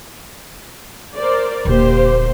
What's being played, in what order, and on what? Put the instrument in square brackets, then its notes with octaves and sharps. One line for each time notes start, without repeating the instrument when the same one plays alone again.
[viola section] A#4 C5 D5
[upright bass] D#1 D3 [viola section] A#3 G4 C5